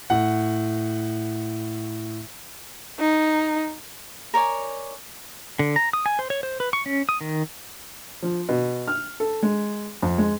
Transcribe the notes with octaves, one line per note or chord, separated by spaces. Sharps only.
A2 F#5
D#4
A#4 C#5 D5 G#5
D3
A#5
D#6
G#5
C5
C#5
C5
B4
C#6
C#4
D#6
D#3
F3
B2
F6
A4
G#3
F2
G#3